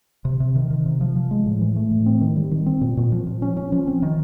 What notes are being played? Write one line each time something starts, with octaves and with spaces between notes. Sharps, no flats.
C3
C3
D#3
D#3
C3
F3
F3
G#3
A2
E3
A3
A2
C4
D#3
G3
D#3
C4
A#2
A#2
F3
F3
C#4
C#4
F3
C4
D#3